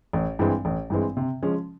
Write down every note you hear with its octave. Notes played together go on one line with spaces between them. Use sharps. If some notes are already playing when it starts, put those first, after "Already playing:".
A1
G2 E3 G#3 C4
A1
G2 E3 G#3 C4
C3
F3 G#3 C#4